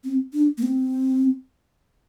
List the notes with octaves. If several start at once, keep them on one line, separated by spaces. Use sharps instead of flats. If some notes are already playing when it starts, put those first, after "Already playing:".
C4
D4
A#3
C4